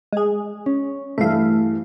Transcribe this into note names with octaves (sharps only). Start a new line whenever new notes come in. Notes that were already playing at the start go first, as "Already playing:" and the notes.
G#3 G#4
C#4
G2 E3 A3 E5 F5